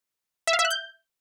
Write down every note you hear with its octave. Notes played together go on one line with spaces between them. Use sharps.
E5
F5
E5
F#6
G6